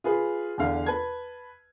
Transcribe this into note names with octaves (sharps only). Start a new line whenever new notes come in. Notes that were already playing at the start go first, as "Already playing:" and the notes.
F4 G#4 B4
E2 D3 F5
B4 A5 G#6